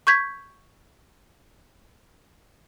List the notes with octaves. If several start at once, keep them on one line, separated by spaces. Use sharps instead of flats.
C#6 G6 G#6 B6